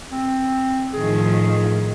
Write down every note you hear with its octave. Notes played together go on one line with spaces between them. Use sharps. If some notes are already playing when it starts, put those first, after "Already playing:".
C4
A2 D#3 F3 G#4